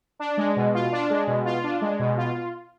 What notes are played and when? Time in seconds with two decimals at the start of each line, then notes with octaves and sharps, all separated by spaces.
0.19 D4
0.37 G#3
0.56 B2
0.74 F4
0.92 D4
1.10 G#3
1.27 B2
1.45 F4
1.64 D4
1.82 G#3
1.99 B2
2.17 F4